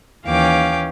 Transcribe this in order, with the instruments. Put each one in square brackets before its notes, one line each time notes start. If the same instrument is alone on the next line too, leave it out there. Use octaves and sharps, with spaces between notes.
[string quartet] D#2 E3 C#4 F5 G5 D6